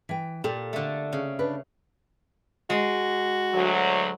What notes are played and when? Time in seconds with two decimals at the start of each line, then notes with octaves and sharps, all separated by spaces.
0.09 E3 G5
0.44 A#2 G4 A4
0.73 D3 A3
1.13 C#3
1.39 D4 B4
2.70 G#3 F#4
3.54 D2 F#3